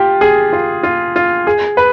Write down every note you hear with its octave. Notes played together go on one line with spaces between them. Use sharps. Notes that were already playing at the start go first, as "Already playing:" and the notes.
Already playing: F4 G4
G#4
F4
F4
F4
G#4
B4